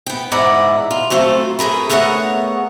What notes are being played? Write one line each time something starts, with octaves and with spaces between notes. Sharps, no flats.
B3 G5
G#2 E3 E4 D5 F#5 A#5
F4
F#3 A3 C4 F4 A4
A3 G#4 A#4 B4
A3 B3 G#4 A#4 C#5 F#5